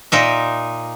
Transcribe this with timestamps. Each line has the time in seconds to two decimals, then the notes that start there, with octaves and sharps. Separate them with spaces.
0.12 A#2 D#4 E5